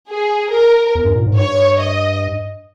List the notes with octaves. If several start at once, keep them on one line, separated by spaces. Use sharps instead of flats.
G#4
A#4
E2
G2
A#2
G#2
G2 C#5
D#5